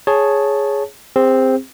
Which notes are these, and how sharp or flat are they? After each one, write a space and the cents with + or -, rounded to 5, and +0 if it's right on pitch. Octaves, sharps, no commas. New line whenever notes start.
G#4 +5 C#5 +0 A5 -5
C4 +0 G#4 -40